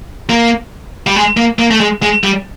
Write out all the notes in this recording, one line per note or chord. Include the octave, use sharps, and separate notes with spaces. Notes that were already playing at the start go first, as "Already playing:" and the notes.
A#3
G3
G#3
A#3
A#3
A3
G#3
G#3
G3